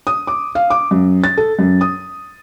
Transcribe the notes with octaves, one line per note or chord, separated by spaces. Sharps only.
D#6
D6
F5
D6
F#2
A6
A4
F#2
D#6